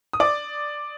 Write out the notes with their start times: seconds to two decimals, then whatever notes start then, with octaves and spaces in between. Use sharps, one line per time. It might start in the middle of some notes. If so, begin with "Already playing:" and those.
0.13 D#6
0.20 D5 D6